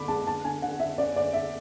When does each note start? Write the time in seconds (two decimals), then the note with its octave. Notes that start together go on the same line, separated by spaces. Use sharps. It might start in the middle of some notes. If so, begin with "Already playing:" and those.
Already playing: D3 D4 B5 D6
0.08 G#3 A5
0.26 D3 A5
0.45 D3 G#5
0.62 D3 F#5
0.80 D3 E5
0.98 C#4 D5
1.16 D3 D5
1.33 D3 E5